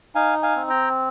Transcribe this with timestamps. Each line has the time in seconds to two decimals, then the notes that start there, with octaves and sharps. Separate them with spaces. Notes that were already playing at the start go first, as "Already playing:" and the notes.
0.15 D#4 F5 G#5
0.43 F5 G#5
0.56 C4
0.70 G5 A#5